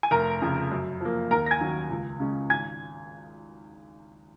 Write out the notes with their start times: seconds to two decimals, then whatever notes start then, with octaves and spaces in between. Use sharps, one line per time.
0.03 G#5
0.11 F1 A#4 A#5
0.42 F2 C#3
0.71 F#2
1.01 F3 A#3
1.31 D#2 A#4 A#5
1.46 A#6
1.51 G#5 G#6
1.61 D#3 F#3 C#4
1.90 C#2
2.20 C#3 G#3 C#4
2.50 G#1 G#5 G#6